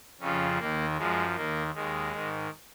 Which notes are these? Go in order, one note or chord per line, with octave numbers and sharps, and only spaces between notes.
F2 C#3 F3 C#4
D#2 D#3 A#3
F#2 F3 G#3
D#2 D#3 A#3
D#2 D#3 G#3
G#2 D#3